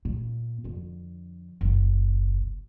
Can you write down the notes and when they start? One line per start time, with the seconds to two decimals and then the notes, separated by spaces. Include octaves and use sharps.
0.05 A#2
0.64 F2 D3
1.61 F#1 B1